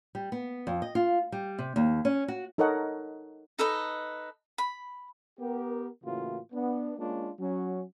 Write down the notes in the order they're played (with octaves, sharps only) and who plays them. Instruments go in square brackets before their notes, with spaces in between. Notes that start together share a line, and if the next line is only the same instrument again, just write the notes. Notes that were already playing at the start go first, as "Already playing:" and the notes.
[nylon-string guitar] G3
B3
F2
D#5
F4
G3
C3
D#2
C#4
F#4
[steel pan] D#4 A4 A#4 C#5 D#5 F#5
[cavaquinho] D#4 A4 B4 D#5
B5
[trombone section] B3 G4 A#4
A2 C#3 E3 A#3 F4 F#4
B3 D4
G#3 A#3 C#4 D4 F4
F#3 C#4